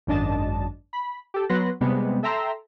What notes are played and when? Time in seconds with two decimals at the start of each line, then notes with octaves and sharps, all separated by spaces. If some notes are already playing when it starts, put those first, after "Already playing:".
0.07 G#1 F#2 D4 D#5 A5
0.93 B5
1.34 G4 A4
1.49 F#3 B3 B4 C6 F#6 A#6
1.81 C3 G3 G#3 B3
2.23 A4 E5 G5 A#5 C6 E6